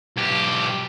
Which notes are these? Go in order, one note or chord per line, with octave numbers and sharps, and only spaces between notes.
B1 G4